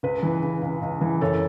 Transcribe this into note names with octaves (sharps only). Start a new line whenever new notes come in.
C#2 B4
E3
C#3
C#2
C#2
E3
F#1 A4 C#5